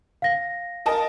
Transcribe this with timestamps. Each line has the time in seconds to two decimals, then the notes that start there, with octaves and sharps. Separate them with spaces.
0.22 F5 A#6
0.86 A#4 D#5 A5